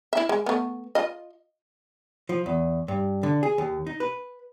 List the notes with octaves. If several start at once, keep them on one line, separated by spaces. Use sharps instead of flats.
E4 E5
G#3
A3 B3
F4 D#5
F3
E2
G2
D3
G#4
D#2
D#4
B4